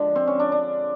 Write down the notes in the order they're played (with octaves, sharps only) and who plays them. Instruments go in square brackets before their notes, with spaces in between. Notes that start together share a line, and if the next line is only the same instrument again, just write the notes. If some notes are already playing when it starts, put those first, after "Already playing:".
Already playing: [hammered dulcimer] D3 F3 G#3 D4
C4
C#4
D4
D4